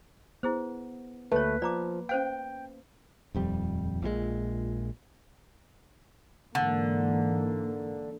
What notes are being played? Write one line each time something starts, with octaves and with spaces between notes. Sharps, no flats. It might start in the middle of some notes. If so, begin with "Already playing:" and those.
B3 E4 G#4 C5
D2 A3 A#3 B4 C#5 A5
F3 D5 A#5 D6
C#4 C5 F5 G5
D#1 F2 G3
A#1 A#2 D3 G#3
G#2 D3 E3 A#3